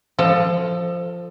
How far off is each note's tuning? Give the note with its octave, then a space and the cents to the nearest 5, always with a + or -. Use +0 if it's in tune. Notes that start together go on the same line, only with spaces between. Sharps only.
F3 +0 A4 +25 D#5 +35